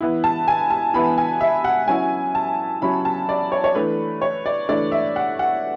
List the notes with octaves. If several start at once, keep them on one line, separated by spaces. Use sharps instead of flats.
E3 B3 E4
A5
G#5
A5
E3 B3 E4 B5
G#5
E5
F#5
F#3 C#4 E4 G#5
A5
F#3 C#4 E4 B5
A5
D5
C#5
C#5
E3 A3 D4 B4
C#5
D5
E3 A3 D4 D5
E5
F#5
F#5